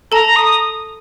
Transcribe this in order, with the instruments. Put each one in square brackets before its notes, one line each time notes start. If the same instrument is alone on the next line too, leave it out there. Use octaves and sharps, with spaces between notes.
[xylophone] A4 A5 [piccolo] A#5
[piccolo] D#6